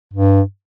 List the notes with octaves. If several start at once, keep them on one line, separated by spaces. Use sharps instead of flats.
G2